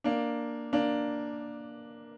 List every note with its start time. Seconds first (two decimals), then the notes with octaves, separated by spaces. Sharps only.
0.04 A#3 D4
0.73 A#3 D4